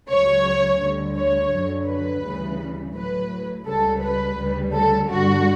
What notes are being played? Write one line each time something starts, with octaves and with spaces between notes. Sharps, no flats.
C#2 C#3 F#3 C#5
D2 D3 G3
C#5
F#2 D3 F#3
B4
D2 C#3 E3 G3
A2 F#3 B4
C#2 C#3 G3 A4
B4
D2 C#3 G3
A4
G2 D3 G3 F#4